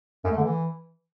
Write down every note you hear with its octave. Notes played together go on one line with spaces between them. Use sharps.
F#2
A3
D3
E3